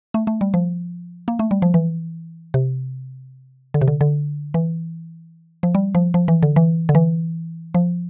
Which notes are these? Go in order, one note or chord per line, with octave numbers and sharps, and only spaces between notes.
A3
A3
G3
F3
A#3
A3
G3
F3
E3
C3
D3
C3
D3
D3
E3
F3
G3
F3
F3
E3
D3
E3
D3
E3
F3